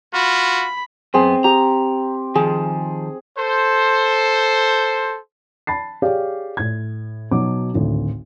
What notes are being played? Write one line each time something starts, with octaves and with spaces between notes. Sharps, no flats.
F4 F#4 B5
F#2 B3 C4 G#4
G4 A#5
D#3 F3 G#4
A4 C5
A5 B5 A6 C7
G4 G#4 C#5 D5 F5
A2 G#6
B2 F#3 D#4 D6
G#1 D2 A2